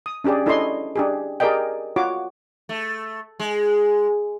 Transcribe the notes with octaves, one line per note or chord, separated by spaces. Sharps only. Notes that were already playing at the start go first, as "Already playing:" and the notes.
D#6
C#4 D4 G4 G#4 D5
D4 E4 A4 C#5 D#5 C6
D4 G4 G#4
G4 G#4 A#4 D5 D#5 G5
F4 F#4 C#5 D6
A3
G#3